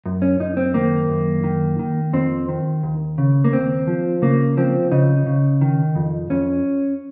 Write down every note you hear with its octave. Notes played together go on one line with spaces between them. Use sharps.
F#2
C#4
F#2 D#4
C4
D#3 A#3
F#2
D#3
D#3
F2 C4
D#3
D#2
C#3
A#3
D#2 C4
F3
C#3 A#3
F3 C4
C#3 D#4
C#3
D#3
F2
F2 C#4